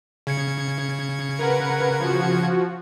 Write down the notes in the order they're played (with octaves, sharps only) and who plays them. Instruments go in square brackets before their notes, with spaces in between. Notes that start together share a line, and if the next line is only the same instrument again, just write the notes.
[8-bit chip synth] C#3 G#6 C#7
[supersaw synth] A#4 B4 F#5
F3 F#4